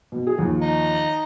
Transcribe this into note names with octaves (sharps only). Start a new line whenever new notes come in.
B2
G#4
D#2 F3
D#4